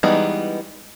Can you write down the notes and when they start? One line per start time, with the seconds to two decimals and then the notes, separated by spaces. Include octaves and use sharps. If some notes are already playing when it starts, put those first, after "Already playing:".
0.03 E3 G3 G#3 B3 D#4